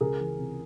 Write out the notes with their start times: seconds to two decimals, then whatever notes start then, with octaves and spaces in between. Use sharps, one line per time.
0.01 C#2 G#4 A#4
0.19 E3
0.38 C3